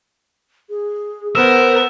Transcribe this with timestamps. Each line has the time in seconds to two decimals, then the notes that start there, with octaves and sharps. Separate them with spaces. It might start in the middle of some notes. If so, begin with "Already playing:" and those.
0.69 G#4
1.35 B3 A#4 C5 E6 E7